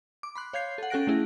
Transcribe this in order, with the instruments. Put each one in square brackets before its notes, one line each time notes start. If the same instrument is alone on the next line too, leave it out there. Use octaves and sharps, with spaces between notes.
[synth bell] D6
B5 C6 F#6
C#5 F5 G6 G#6 C7
A4 F#5
C#4 A4 G5 F#6 A#6 D7
A3 C#4 E4 G#4